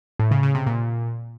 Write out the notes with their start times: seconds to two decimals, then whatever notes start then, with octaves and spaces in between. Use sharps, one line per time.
0.19 A2
0.31 C#3
0.43 C#3
0.55 C3
0.66 A#2